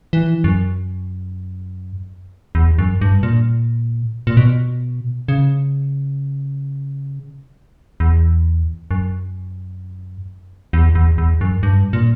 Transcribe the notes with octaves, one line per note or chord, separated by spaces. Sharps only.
E3
F#2
E2
F#2
G2
A#2
A#2
B2
C#3
E2
F#2
E2
E2
E2
F#2
G2
A#2